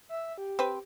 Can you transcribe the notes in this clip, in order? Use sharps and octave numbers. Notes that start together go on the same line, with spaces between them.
E5
G4
C4 B4